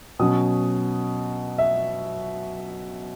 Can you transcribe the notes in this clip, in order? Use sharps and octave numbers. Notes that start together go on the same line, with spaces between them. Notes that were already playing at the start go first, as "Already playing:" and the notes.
B2 F#3 C#4 D#6
E5